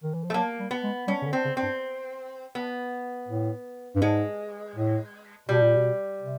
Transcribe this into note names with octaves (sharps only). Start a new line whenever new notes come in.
D#3
E3
F3
A3
F#3 A#3
G3
B3
G#3
G3 C#4
C#3
D3
C4
C#3
C4
G2
B3
A2
G2
G#2 G#3
A2
B2 G3
A#2
B2
C3